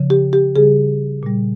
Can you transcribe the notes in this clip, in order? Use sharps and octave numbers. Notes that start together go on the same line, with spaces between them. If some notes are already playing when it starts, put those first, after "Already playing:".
Already playing: C#3 F3
G4
G4
C#3 G3 G#4
A#2 G3